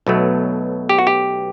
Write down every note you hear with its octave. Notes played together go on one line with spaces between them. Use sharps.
B1 B2 F#3 A3
G4
F#4
G4